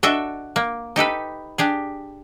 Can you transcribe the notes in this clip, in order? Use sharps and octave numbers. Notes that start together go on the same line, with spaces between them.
D4 F#4 A4 D#5 E5
A#3
D#4 G4 A4 B4
D4 G4 G#4